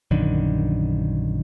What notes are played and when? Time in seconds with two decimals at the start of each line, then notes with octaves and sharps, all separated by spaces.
0.11 A#1 F#2 D3 D#3